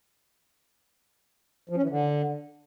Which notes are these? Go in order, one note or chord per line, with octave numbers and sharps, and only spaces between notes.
F3
C#4
E3
D3